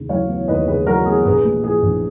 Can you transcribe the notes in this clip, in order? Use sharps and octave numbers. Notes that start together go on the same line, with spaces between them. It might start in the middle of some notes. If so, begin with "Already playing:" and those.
Already playing: D#2 C#3
F#3 C#5 F5
B3
D#2 B4 D#5
C#3 G#4 B4
F#3 F#4 A#4
B3 G#4
A#1 G#4 B4
A#2
F3 G#4
A#1